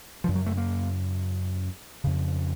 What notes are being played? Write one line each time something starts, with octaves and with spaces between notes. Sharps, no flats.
F#2 C#3 F3
F#3
A3
A#3
F2 C#3